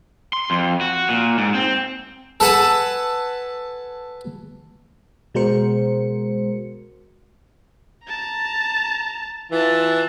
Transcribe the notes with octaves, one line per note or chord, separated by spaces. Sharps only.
C6
F2
F#4
A#2
G#2
C4
A4 B4 F#5 G#5 A5
B2 G#3 F#4 A#4 C5 C#7
A5 A#5
E3 F4 A5